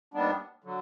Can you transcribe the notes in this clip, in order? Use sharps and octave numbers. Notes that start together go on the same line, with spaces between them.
D#2 D#3 G3 B3 D4
D3 F#3